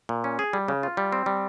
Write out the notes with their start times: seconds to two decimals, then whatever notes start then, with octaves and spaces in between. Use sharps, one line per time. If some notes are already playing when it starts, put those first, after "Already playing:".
0.09 A#2
0.24 C#4
0.39 G#4
0.53 G3
0.68 C#3
0.83 F4
0.97 G3
1.12 C4
1.26 G3